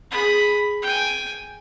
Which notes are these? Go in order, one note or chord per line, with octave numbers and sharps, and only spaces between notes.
G#4 B5
G5 G#5